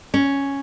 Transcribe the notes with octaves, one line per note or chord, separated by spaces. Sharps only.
C#4